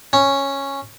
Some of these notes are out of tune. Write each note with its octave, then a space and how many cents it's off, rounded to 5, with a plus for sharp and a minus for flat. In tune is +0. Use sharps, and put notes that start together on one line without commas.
C#4 -5